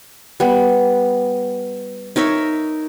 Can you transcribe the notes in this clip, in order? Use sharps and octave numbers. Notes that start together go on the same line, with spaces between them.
G3 B3
D#4 A#4 C#5 E5